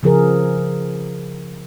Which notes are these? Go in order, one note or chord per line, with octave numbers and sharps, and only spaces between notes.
C#3 F3 G#4 A#4